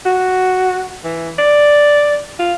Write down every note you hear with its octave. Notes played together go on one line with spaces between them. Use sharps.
F#4
E3
D5
F4